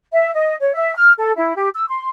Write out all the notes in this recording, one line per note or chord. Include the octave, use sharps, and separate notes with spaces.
E5
D#5
C#5
E5
F6
A4
E4
G4
E6
C6